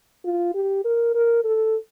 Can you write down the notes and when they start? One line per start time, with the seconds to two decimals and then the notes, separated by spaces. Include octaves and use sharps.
0.25 F4
0.55 G4
0.85 A#4
1.14 A#4
1.44 A4